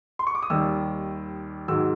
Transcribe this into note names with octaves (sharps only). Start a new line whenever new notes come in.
C6
C#6
D6
D#6
D#2 D#3 G3 E6
G#2 D#3 F#3 E6